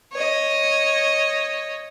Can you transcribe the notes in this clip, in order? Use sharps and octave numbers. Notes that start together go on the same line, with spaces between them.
C#5 D#5